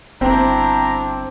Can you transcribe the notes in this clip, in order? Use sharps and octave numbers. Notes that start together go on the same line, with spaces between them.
G1 C4 D4 E4 A#5